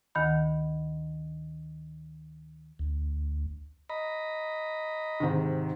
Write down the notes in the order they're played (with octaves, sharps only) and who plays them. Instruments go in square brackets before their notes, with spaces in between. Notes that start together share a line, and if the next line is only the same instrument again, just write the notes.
[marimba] D2 D#3 F#5 B5
[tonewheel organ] D2
[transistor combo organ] D#5 A#5 B5
[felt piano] G#2 C3 D#3